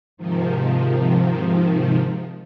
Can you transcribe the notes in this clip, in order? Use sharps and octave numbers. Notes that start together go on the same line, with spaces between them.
G#2 C3 D#3 F3